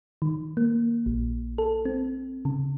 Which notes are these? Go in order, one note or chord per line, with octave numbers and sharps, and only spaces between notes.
D#3
A#3
A#1
A4
C4
C#3